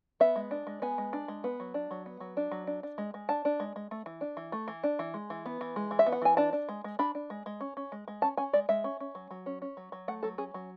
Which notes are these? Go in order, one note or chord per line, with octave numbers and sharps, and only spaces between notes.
B3 E5
G#3
D4
G#3
B3 G#5
G#3
D4
G#3
B3
F#3
D4
F#3
B3
F#3
D4
F#3
D4
D4
G#3
G#3
D4 A5
D4
G#3
G#3
A3
E3
D4
E3
A3
E3
D4
E3
G#3
E3
B3
E3
G#3
E3
E5
B3
F#5
E3 G#5
D4 A5
D4
G#3
G#3
D4 B5
D4
G#3
G#3
C#4
C#4
G#3
G#3
C#4 A5
C#4 G#5
G#3 D5
G#3 E5
C#4
C#4
F#3
F#3
C#4
C#4
F#3
F#3
A3 F#5
F#3 A4
C#4 G#4
F#3